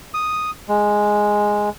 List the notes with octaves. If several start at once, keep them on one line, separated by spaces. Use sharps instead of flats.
D#6
G#3